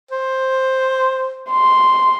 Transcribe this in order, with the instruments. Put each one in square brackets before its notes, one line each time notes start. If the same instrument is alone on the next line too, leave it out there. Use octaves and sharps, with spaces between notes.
[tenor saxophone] C5
[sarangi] C6